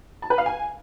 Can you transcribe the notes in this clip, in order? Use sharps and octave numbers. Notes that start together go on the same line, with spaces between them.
A5
B4
F5
G#5